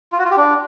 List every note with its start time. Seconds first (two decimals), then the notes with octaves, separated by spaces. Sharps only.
0.12 F4
0.19 F#4
0.25 F4
0.31 G4
0.37 D4